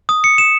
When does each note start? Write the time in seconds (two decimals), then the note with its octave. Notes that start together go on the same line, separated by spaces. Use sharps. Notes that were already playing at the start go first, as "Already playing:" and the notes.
0.09 D#6
0.24 C#7
0.38 E7